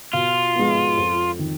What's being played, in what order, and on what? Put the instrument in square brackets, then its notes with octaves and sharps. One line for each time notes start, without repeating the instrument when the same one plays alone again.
[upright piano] B2 [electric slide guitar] F4
[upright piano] G#3 B3
F2
D#3